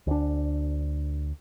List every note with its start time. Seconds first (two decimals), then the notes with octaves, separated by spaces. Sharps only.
0.07 D2 D4